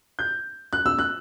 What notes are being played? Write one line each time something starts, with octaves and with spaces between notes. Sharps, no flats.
G6
F#6
E6
F#6